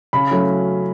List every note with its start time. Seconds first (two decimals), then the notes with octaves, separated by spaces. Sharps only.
0.13 C#3 B5
0.31 F#3 A3 C#4